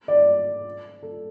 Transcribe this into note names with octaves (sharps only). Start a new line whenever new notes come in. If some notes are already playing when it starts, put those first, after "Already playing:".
D5
A4